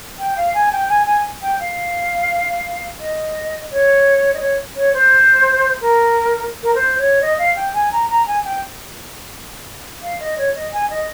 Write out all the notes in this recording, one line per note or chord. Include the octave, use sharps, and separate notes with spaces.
G5
F5
G#5
G5
G#5
G#5
G5
F5
D#5
C#5
D#5
C#5
C#5
C5
A#4
A#4
C5
C#5
D#5
F5
G5
G#5
A#5
A#5
G#5
G5
F5
D#5
C#5
D#5
G#5
D#5